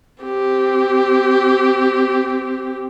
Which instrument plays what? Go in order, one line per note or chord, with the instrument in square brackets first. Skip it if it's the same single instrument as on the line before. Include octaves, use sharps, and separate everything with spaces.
[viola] C4 G4